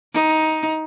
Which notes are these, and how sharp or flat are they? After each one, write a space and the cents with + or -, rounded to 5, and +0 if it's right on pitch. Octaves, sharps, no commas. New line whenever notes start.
D#4 +15